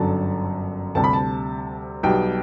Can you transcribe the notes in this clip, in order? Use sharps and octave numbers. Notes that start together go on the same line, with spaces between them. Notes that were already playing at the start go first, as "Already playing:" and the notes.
Already playing: G1 F#2 D3 F#3 A5
D2 C3 G3 A5
B5
A5
B1 B2 G3 G5